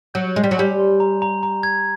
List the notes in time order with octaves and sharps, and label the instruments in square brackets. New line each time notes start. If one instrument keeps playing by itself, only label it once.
[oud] F#3 [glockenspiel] G6
[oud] G#3 [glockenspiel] C6
[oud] G3
F#3
[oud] G3 [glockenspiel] G#5
[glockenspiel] C6
A#5
A#5
A#5
G#6